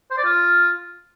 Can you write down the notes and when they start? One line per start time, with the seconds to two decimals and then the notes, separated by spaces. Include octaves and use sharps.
0.11 C5
0.18 D5
0.25 F4